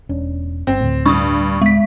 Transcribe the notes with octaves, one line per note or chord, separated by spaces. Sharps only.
E1 C#4 D4
G1 C4
D2 A2
G2 C#6 D#6
G#3 B6